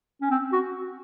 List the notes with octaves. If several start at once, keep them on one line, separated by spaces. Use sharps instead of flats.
C#4
C4
F#4